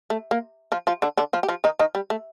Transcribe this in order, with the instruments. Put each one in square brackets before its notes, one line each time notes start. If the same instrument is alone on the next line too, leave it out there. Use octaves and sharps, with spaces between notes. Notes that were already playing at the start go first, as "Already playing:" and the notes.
[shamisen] A3
A#3
F3 F4
F3 F4
D3 D4
D3 D4
F3 F4
G4
F3 F4
D#3 D#4
D#3 D#4
G3
A3